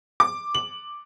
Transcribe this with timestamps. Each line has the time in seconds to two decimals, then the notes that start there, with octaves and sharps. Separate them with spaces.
0.20 D6
0.55 F#7